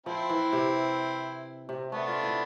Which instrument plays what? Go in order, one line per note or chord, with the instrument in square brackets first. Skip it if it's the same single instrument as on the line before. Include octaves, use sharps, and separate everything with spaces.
[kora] F3 [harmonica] C4 E4
[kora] E3
C3
C3
[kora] A3 [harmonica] B3 D4
[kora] F4
E4